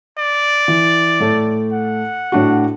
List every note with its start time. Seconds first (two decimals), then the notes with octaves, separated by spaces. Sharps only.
0.18 D5
0.68 E3
1.20 A2 A3
1.73 F#5
2.32 A2 D4 F#4